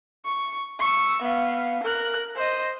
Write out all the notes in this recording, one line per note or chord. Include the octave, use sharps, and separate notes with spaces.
C#6
C#6 E6
B3 F5
A#4 F#6
C5 D#5